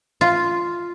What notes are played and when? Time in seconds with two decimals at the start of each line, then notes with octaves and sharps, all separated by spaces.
0.21 F4